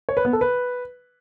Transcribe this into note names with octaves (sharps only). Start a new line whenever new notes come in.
C#5
B4
B3
A4
B4